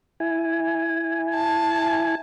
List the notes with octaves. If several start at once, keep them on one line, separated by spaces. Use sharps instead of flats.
E4 G#5
A5